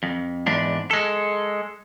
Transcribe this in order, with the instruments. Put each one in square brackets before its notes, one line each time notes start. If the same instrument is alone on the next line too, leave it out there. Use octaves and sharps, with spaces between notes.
[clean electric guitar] F2
E2 G#2 D4
G#3 A4